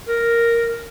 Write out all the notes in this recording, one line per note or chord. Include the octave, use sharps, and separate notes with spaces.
A#4